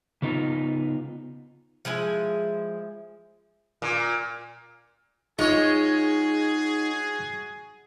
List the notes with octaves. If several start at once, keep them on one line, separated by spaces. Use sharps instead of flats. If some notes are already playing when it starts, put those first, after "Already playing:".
C#3 B3 D#4 F4
F3 G#3 E4 G#5
A#2
G#3 D#4 F4 F#4 G#4 C#5